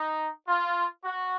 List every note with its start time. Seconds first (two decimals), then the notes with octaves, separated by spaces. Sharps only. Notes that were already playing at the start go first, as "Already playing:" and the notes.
Already playing: D#4
0.46 F4
1.03 F#4